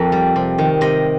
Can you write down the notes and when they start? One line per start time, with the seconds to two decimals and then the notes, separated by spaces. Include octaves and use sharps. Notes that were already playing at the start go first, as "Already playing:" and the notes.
Already playing: F2 A#3
0.12 G3
0.36 C3
0.58 D#3
0.81 C3 D#5